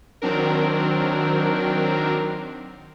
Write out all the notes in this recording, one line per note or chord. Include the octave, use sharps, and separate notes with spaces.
D#3 F#3 C4 D4 A#4